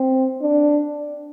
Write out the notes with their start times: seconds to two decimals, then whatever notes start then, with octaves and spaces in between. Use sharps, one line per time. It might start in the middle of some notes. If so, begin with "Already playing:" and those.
Already playing: C4
0.42 D4